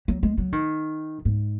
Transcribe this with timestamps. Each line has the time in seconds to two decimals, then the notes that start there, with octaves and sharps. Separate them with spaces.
0.08 F#3
0.23 G#3
0.38 F#3
0.52 D#3
1.25 G#2